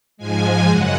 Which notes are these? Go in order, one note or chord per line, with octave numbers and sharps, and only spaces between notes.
G#2 F3 G#3 G#5
F#2 C#3 G#3 F#5